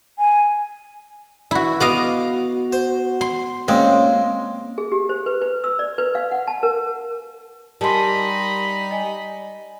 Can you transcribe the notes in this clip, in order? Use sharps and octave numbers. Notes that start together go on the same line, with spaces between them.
G#5
E3 E4 F#4
B3 F#4 D#5 F5 D6
C5
C6
A#2 G#3 C4 C#4
G#4
G4
C5
B4
B4
E6
D5
B4
F5
F#5
A5
A#4
G3 D#4 A#4 D#5 G#5 A5 B5 C6
D#5 G#5